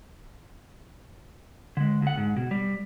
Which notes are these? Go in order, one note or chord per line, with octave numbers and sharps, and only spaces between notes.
D3 G#3
D2 F#5
G#2
B2
G3